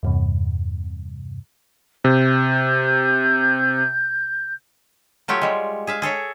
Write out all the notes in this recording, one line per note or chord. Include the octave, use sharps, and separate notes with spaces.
E2 G2 C3
C3 G6
F#3 A3 F4 G4 C#5
G3 G#3
G#4 E5 F5
G#4 A4 C#5 E5